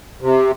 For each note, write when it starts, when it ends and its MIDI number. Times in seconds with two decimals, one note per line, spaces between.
0.21 0.52 48